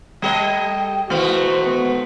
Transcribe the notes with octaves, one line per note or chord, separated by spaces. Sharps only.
G3 A4 D#5 G5
B2 D#3 E3 G#3 A3 F#4 C5
B3